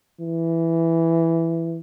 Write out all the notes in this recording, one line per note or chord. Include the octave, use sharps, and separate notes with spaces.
E3